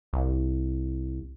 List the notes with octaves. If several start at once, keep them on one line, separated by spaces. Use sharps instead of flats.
C2